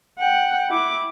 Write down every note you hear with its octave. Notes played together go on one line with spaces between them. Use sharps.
F#5 G5
E4 D6